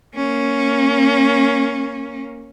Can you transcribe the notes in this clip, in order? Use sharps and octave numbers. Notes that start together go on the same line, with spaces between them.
A#3 C#4